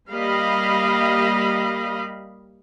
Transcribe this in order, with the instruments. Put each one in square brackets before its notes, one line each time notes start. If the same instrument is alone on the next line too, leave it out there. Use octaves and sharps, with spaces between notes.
[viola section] G3 A#3 G4 D#5 F5 B5